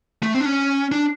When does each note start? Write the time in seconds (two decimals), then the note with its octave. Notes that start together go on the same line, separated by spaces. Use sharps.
0.23 A3
0.34 C4
0.41 D4
0.46 C#4
0.92 D4